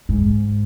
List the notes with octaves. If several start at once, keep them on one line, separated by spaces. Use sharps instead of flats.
G#2